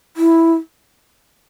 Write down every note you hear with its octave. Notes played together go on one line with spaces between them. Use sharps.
E4